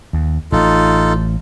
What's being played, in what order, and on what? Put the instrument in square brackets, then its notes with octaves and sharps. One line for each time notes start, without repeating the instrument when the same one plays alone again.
[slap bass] D#2
[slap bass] A1 [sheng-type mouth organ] D#4 F4 A4